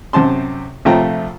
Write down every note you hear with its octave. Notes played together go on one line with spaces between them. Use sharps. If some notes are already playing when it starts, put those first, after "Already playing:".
F#2 C3 C5 A5 C6
A#1 C3 A3 F4 G5 A#5